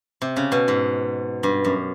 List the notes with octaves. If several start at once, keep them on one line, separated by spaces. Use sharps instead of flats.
C3
C#3
B2
G#2
G2
F#2